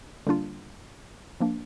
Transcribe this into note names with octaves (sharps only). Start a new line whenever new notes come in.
D3 G3 A#3 D4 F4
F3 A#3 D4